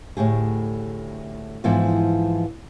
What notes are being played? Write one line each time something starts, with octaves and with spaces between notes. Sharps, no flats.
D2 A2 G4 G#4
G#2 E3 F3 B3 D#4